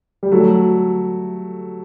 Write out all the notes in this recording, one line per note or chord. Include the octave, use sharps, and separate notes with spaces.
G3
F#3 A3